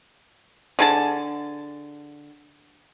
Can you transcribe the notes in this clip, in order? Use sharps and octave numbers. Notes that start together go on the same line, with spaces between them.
D3 G#4 A5